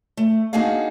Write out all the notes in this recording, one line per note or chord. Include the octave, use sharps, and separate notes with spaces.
A3
A#3 D4 D#4 F#4 G#4 F5